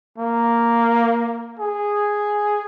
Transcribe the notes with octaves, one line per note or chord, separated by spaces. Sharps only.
A#3
G#4